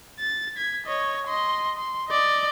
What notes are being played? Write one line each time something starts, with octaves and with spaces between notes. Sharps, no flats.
A6
G#6 B6
C#5 D#5
D#5 C6
C6
D5 D#5